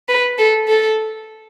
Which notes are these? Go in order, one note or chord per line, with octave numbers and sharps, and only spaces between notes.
B4
A4
A4